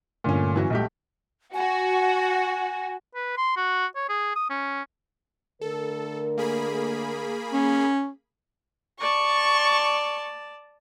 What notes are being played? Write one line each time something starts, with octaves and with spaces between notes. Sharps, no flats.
G2 A#2 D3 A3 C#4
E3 F#3 C#4
B1 A#2 G#3 A3 G4
F#4 G#5
B4
C6
F#4
C#5
G#4
D#6
C#4
D3 A3 A4 A#4
A#3 G#4 B5
C#4
D5 A5 C#6